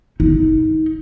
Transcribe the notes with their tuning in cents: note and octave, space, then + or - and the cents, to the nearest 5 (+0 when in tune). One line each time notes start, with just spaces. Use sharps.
D#4 +25